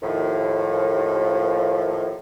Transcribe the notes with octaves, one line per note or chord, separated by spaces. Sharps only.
D#2 A2 F3